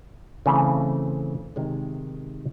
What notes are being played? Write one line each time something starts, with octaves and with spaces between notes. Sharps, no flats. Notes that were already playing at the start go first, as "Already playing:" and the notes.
C#3 E3 A3 C4
C3 D#3 G#3